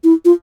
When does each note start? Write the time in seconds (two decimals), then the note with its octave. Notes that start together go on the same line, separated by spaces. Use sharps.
0.04 E4
0.25 F4